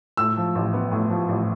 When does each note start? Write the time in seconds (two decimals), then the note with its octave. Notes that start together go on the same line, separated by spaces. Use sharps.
0.17 A2 E6
0.37 F3
0.55 A1
0.73 B3
0.92 A2
1.10 F3
1.29 A1